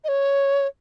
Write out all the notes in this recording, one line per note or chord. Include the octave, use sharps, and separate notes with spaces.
D#5
C#5